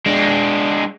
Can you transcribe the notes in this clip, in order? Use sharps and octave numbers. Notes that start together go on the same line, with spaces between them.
G#3 D4